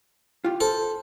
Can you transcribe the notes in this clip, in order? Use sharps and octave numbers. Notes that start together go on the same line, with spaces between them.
F4 G4
A4 C5